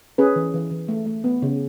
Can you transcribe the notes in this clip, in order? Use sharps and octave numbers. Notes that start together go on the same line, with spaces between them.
C#4 G#4 B4
E3
E3
E3
A3
A3
B3
C#3